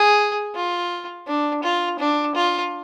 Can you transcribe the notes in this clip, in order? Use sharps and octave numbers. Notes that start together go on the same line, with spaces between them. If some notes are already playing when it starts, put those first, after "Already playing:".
Already playing: G#4
F4
D4
F4
D4
F4